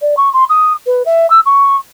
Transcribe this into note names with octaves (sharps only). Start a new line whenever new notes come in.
D5
C#6
C6
D#6
B4
E5
E6
C#6